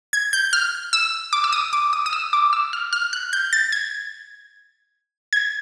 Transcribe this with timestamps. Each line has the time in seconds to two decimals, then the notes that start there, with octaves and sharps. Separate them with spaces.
0.13 G#6
0.33 G6
0.53 F6
0.93 E6
1.33 D6
1.44 E6
1.53 D#6
1.73 D6
1.93 D#6
2.06 D#6
2.13 E6
2.33 D6
2.53 E6
2.73 F6
2.93 F6
3.13 F#6
3.33 G6
3.53 A6
3.72 G#6
5.33 G#6